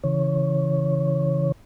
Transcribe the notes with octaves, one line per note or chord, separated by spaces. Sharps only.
C#3 E3 C#5